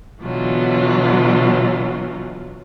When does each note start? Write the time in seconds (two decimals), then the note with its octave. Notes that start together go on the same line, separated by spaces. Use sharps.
0.22 B2 D3 E3 F#3 F4